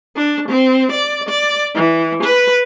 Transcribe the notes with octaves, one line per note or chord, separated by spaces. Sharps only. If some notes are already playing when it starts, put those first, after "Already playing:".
D4
C4
D5
D5
E3
B4